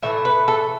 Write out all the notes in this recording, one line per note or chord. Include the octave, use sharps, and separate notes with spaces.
A2 E3 A3 E5
B4
A4